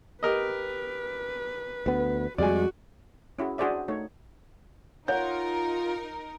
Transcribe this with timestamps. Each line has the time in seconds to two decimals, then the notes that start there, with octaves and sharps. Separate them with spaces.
0.23 G4 A#4 B4 D#5
1.86 D2 B3
2.38 F2 G3 G#3 F#4 D5 G#5
3.39 C#4 E4 F#4 G#4
3.58 D4 F#4 G#4 C5 D5 E5
3.88 A3 D#4 C#5
5.08 D#4 F4 A#4 C#5 F#5 G6